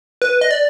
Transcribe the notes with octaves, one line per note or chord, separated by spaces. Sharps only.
B4
D#5
D5